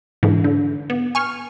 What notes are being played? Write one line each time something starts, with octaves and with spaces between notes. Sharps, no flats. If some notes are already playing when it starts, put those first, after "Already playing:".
G#2 D3 E3
D3
B3
G#5 C#6 F6